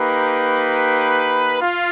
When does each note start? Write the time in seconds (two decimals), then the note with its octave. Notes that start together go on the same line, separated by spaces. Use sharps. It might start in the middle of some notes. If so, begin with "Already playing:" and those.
Already playing: A#3 D#4 G4 B4
1.61 F4